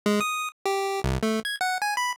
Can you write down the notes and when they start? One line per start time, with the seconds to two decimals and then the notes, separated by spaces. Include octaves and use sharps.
0.06 G#3
0.21 D#6
0.66 G4
1.04 C2
1.23 A3
1.45 G#6
1.61 F#5
1.82 G#5
1.97 B5